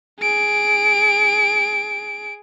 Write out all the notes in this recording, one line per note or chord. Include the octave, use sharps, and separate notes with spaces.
G#4 D7